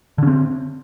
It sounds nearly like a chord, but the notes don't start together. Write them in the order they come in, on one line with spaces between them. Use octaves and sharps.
D3 C#4 C4